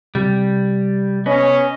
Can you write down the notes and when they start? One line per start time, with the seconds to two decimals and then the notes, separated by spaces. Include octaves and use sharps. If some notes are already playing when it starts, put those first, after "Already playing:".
0.15 C3 G3
1.26 B3 C#4 D#5